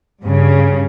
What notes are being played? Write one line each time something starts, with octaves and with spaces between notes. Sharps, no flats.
G2 C#3